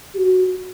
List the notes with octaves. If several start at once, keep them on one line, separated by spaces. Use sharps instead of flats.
G4
F#4